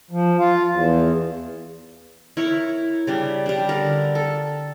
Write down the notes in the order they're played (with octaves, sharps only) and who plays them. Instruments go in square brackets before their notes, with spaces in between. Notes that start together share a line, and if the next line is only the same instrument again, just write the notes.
[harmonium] F3
F4
E2
[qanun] E4 A#4 C#5
C#3 G3 D4
G3 D4
D3 A#4
A4